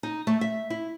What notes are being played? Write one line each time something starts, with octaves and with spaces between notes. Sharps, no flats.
D#4
A3
E5
E4